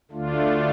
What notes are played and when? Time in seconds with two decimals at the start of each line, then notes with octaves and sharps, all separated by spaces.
0.11 D2 D3 A3 D4 F4